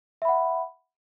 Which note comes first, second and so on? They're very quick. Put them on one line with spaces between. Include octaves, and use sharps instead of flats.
E5 B5 F#5